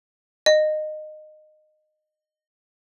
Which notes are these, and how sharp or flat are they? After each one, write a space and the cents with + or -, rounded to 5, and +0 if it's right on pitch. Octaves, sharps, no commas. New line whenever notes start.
D#5 -20